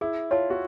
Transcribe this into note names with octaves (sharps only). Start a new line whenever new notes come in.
E4 G#4
F4 C#5 F5 A5
F#4